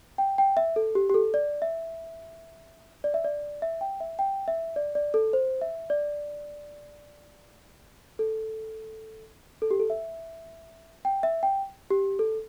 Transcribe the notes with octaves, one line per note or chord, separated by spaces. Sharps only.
G5
G5
E5
A4
G4
G4
A4
D5
E5
D5
E5
D5
E5
G5
E5
G5
E5
D5
D5
A4
C5
E5
D5
A4
A4
G4
A4
E5
G5
E5
G5
G4
A4